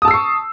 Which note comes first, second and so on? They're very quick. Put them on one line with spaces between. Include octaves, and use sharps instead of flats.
D#6 A5 E6 C7 C#6